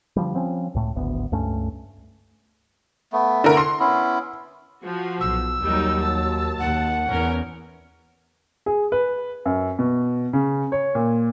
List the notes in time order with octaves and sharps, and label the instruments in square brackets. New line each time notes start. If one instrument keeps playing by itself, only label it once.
[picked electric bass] D3 F3 G3
F3 C4 C#4
C#2 A2
D1 G#1 D2 B3
C#2 G2 A3 C#4
[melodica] A3 B3
[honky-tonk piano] D3 A#4
C6
[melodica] B3 C#4 E4
[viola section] F3 F#4
[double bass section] B1 [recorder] E6
[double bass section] D#2 F#3 [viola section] G3 D#4
[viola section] A5
[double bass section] D#2 [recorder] F#5
[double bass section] E2 [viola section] C#4 A#4
[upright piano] G#4
B4
F#2
B2
C#3
C#5
A#2